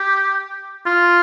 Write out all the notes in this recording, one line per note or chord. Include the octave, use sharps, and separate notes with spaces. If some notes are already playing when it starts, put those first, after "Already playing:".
Already playing: G4
F4